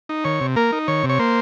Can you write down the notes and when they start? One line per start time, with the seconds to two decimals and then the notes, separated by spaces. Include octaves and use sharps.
0.09 D#4
0.24 D#3 C#5
0.41 C3
0.56 A#3 A#4
0.72 D#4
0.88 D#3 C#5
1.04 C3
1.09 C#5
1.19 A#3 C5